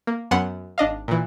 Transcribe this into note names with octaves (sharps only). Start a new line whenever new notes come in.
A#3
F#2 B3 F#5 C6
G#1 D4 D#5 F5
A#2 E3